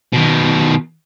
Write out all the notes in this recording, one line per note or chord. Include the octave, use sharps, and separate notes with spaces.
B2 D#3